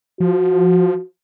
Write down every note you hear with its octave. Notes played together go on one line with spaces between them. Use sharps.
F3 F#4